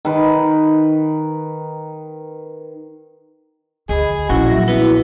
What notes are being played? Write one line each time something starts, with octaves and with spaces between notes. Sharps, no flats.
D#3 B4
D2 G#4 D#5 B5
A#1 C#4 E4 F#4
F#3 E5
B3 E4 F#4